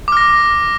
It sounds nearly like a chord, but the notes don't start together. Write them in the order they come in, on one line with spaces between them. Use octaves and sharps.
D6 F6 A#6